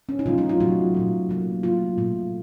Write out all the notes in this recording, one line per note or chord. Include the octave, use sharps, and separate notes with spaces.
C#4
D#4
C3 F#3 A3 F4
D#4
F4
A#2 F#3 A3 F#4
A#2 F#3 A3
C3 F#3 A#3
C3 F#3 A3 F4
A#2 F#3 A3